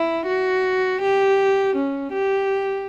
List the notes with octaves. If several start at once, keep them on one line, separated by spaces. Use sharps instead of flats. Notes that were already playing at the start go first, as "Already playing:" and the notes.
Already playing: E4
F#4
G4
C#4
G4